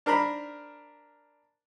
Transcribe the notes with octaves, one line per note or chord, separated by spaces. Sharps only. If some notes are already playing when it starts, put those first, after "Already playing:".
D4 A#4 C5 A#5 B5